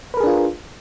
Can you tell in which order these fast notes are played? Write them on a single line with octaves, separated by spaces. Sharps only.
B4 A#4 G#4 D4 F4